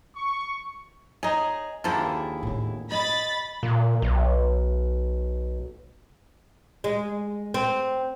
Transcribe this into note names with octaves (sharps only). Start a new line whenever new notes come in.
C#6
D#4 G#4 C#5 D#5
D#2 D3 F3 A#3 E4 G#4
A2 C4
D#5 B5 A6
A#2
B1
G#3
C4